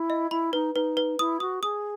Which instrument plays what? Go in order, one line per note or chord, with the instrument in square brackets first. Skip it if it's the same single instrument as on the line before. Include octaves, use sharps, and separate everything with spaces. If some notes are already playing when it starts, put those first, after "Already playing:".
Already playing: [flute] E4
[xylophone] D#5
[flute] E4 [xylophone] B5
[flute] D#4 [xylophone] B4
[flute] D#4 [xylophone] B4
[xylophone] B4
[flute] E4 [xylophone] D#6
[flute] F#4 [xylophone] D#6
[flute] G#4 [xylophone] D#6